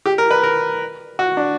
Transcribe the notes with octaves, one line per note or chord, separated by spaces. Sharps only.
G4
A#4
B4
A#4
F#4
D4